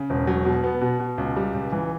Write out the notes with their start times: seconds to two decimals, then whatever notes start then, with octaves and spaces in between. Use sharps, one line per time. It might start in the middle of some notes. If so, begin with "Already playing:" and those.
Already playing: C#3
0.10 E1
0.27 F#3
0.45 B2
0.64 B3
0.81 B2
1.00 B2
1.18 C#2
1.36 G3
1.54 C#2
1.72 E3